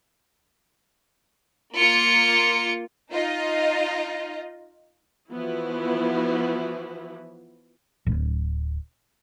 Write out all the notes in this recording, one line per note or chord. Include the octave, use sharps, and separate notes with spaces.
A#3 F4 C#7
D#4 F4 D#5
E3 F3 B3 E4 F#4
D1